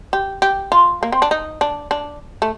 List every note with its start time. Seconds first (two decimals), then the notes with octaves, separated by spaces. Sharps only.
0.13 G4
0.42 G4
0.72 F4
1.03 A#3
1.12 C4
1.22 D4
1.31 D#4
1.61 D4
1.91 D4
2.42 A3